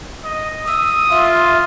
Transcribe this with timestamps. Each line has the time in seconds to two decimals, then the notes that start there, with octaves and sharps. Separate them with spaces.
0.24 D#5
0.67 D#6 E6
1.10 F4 E5